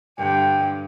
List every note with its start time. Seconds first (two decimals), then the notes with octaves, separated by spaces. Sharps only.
0.18 G2 D3 G5